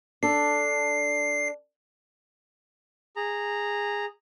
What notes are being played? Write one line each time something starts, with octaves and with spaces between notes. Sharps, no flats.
D4 A4 C7
G#4 A#5